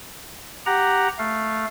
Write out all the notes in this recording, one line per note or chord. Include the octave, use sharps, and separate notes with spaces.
G4 F#5 A#5
A3 F5